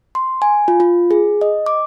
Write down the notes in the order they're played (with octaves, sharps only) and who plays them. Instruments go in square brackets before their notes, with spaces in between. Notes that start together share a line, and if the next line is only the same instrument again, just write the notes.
[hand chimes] C6
G#5
F4
F4
G#4
D#5
D6